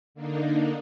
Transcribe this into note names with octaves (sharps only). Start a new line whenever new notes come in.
D3 A#3 D4 D#4